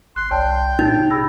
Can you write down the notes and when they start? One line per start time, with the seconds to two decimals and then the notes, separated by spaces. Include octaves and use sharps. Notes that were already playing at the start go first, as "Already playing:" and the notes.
0.16 G1 C6 F#6
0.31 C2 C#5 D5 G5 A5
0.79 A#2 D#4 G6 A6
0.98 C3
1.10 G#4 B5 E6 A#6